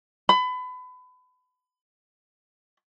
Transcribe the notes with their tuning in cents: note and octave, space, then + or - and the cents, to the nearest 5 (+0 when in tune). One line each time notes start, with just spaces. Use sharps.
B5 +30